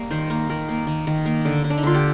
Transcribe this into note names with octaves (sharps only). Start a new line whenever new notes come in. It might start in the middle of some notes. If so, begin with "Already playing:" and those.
Already playing: G3 A#3
D#3 C5
A#3 A#4
D#3 A#4
A#3
D#3
D#3
A#3
D3
D3
D4
D#4
D3 F4
G4